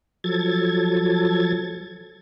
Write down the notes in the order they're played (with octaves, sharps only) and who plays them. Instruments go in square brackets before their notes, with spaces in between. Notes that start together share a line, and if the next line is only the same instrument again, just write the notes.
[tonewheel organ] F3 F#3 A4 G#6 A6